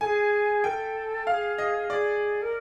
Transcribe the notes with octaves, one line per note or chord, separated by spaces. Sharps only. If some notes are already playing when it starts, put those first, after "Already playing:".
G#4 A4 G#5
A#4 G5
A4
G#4 A4 F5
D#5
G#4 D5
A#4